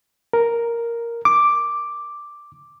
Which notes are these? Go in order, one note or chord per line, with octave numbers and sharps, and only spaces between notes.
A#4
D6